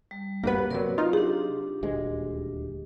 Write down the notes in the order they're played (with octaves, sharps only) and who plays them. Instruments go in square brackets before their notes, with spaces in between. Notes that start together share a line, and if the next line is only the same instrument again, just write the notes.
[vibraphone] G3
[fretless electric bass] D2 G2 B3 [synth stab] A#3 B4 [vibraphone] G4
[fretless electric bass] C3 F#3 [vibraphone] A#4 D5
[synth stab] D#4 F4
[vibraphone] D4 G4 [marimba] G#4
[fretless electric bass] D#1 D2 G#3